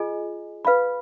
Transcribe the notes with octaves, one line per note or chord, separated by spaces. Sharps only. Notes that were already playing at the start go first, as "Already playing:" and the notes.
Already playing: F4 G#4 D#5 G#5
B4 F5 B5